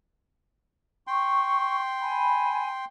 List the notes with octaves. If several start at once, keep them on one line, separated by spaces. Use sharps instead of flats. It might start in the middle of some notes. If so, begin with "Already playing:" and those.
G5 C6 C#6
G#5 B5